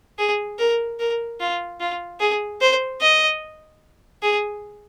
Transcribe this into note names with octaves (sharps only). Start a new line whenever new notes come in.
G#4
A#4
A#4
F4
F4
G#4
C5
D#5
G#4